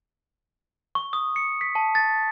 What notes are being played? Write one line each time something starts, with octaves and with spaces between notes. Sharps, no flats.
C#6
D#6
C#7
B6
A5
A6